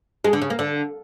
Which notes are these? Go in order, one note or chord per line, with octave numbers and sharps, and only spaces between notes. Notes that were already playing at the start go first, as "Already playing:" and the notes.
G#3
D3
C#3
A#3
D3